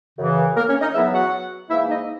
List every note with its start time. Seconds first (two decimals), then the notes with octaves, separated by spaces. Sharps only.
0.19 F#2 C#3 E3
0.56 A#3 A#4
0.69 C#4 C#5
0.81 D#4 D#5
0.94 E2 C#3 F#3 B3 E4 E5
1.13 F#4 F#5
1.70 G#2 E3 A#3 E4 E5
1.89 D#4 D#5